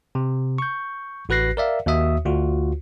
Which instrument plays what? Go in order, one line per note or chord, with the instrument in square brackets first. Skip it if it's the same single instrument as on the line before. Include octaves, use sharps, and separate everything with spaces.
[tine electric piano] C3
C#6 G6
A1 F#4 B4 F#6 A#6 C7
A#4 D5 E5 F5
D#2 F#4 E5 D#6
D2 F4 F#4